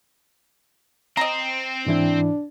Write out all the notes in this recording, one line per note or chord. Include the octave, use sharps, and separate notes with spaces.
C4 D#5 A#5
G#2 E3 D4 E4